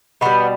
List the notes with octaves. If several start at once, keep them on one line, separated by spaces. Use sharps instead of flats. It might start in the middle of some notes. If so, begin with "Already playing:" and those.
B2 G3 B3